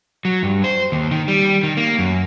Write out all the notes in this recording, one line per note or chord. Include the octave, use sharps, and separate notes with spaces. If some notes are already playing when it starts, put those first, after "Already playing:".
F#3
G2
C5
D#2
D#3
G3
D#3
A#3
F#2